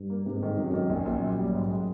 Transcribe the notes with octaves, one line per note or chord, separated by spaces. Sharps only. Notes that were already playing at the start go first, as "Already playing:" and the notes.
Already playing: G2
A#3
G#2 C3
D#3
F#2 C3
D#3
A#1 F#2
A#1
A#2
G3
G#2
G#3